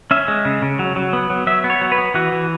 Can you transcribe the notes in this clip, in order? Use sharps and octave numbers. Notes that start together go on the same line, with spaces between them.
C#4 E5
G#3
C#3
C#3
F#3
F#3
B3
F#3
F#3 E5
B3
C#5
F#3
B4
B3
E3 F#4
E3